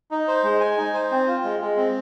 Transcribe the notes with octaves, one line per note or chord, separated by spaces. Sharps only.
D#4
C5
G#3
G#5
D#4
C5
C4
F4
G#3
G#3
C4